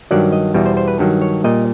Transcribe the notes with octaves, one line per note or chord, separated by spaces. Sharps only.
G2 D#3 F#3 D5
D#5
E2 B2 G3
C5
C5
B4
G2 D#3 F#3
C#5
A#2 G3 D#5